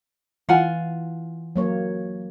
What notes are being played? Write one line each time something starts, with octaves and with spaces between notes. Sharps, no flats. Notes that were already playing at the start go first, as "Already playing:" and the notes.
E3 F4 F#5 G#5
F#3 A#3 C#5